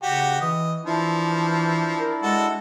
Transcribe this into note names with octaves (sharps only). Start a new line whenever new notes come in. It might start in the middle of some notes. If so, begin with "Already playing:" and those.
C#3 F#4 G4
E3 D#5
E3 F3 D4 E4
A#4
G#3 F#4 A4